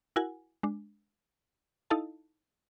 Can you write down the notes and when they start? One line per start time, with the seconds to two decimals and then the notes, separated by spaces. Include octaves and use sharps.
0.16 E4 F#4 A#4 F#5 G#5
0.63 G#3 D4
1.90 D#4 E4 A4 D#5 F5 A5